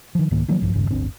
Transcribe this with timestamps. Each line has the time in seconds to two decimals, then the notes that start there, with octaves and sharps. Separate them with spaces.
0.15 D#3 F3
0.31 C2 G#2 D#3 A#3
0.48 D#3 F3 F#3 A#3
0.61 A#1 G2 F3
0.74 D#1 G#1 G2 C#3
0.91 D1 G1 C4 D4